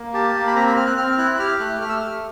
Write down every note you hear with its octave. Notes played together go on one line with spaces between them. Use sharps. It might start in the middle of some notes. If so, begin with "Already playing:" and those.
Already playing: A#3
G4 A5
A#3
B5
C4 A#5
B5
C4 F6
F#6
C4 F6
F6
E4 F#6
F#6
G4 F6
A3 F#6
A3 F6
E6
F6
G4